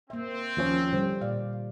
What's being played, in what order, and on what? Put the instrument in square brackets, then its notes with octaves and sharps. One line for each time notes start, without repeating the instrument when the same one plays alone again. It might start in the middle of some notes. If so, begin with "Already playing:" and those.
[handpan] A#3 E5 [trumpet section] C4
[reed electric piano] D#2 F3 C#4
[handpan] D3 G3 C5
[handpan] A#2 D5 [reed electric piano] F5